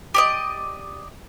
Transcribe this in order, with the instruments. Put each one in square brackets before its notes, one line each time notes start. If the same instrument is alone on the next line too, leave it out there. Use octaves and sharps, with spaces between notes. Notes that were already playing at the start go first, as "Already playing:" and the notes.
[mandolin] G4 D5 D#5